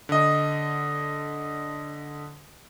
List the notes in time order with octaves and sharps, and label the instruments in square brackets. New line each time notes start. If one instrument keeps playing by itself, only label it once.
[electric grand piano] D3 D#5